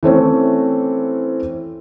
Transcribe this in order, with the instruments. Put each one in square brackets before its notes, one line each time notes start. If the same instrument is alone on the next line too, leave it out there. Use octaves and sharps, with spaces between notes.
[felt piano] E3 A3 C4 C#4